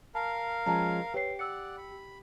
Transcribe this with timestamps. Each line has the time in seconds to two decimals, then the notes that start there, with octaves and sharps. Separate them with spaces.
0.15 A#4 F5 A5
0.66 F3 G#3 C#4 A5 A#5
1.14 G4 B4 C#5 C7
1.39 D5 F#5 E6 C#7
1.77 B5